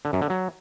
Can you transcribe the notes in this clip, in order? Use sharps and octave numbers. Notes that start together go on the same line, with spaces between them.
D3
F#2
D3
F#3